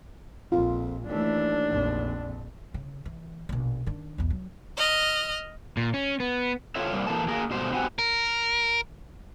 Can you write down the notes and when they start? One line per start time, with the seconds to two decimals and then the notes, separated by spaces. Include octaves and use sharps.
0.52 A#1 F2 F4
1.09 D#2 E3 A3 D4
1.69 A#1 F2
2.74 C#3
3.05 E3
3.49 A#1 B2
3.86 D#3 D4
4.18 B1 E2
4.30 F#3
4.77 D#5 F6
5.77 A#2
5.94 C#4
6.20 B3
6.75 C4 F4 A4 C#5 E5
6.93 G3 A#3 C4
7.07 E3 A#3 A4 A5
7.28 A#3 G#4 A#4
7.51 G#2 B2 G3 A3 C5
7.72 B3 C4 F#4 G4 F#5 G#5
7.99 A#4